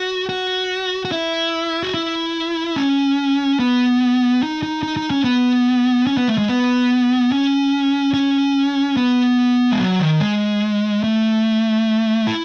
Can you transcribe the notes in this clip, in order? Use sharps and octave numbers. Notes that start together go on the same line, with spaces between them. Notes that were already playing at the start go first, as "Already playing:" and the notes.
Already playing: F#4
F#4
F#4
E4
F#4
E4
C#4
B3
D#4
D#4
D#4
D#4
C#4
B3
C#4
B3
A3
G#3
B3
C#4
C#4
B3
G#3
F#3
D#3
G#3
A3
E4